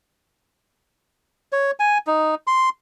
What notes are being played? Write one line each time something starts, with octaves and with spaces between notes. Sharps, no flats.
C#5
G#5
D#4
C6